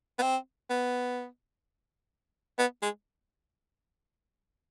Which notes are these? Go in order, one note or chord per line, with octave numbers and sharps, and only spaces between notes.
B3
C4
B3
B3
G#3